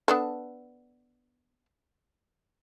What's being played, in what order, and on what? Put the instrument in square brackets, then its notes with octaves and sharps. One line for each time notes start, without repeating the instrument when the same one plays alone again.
[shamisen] B3 D4 A4